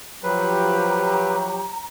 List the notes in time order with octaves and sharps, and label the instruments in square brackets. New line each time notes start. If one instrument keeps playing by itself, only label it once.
[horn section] F3 F#3 G4 [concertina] B4 [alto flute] A#5